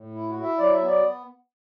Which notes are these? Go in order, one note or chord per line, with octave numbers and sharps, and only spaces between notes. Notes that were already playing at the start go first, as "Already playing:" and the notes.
Already playing: A2
E4
F#4
E4
E5
F#3 D5
E5
B3
D5